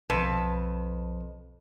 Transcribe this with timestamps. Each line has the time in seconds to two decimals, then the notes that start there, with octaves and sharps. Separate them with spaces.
0.10 B1 F2 B4 A5